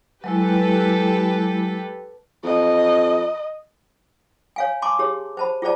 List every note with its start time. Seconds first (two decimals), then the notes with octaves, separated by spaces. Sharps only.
0.24 F#3 G#3 E4 G4 A4 B4
2.44 F2 D#5
4.56 C#5 F5 G#5
4.82 G#5 A5 C6 D6
4.99 G4 G#4 C#5
5.37 C5 A5 B5
5.62 F4 G#4 C5 D5 A5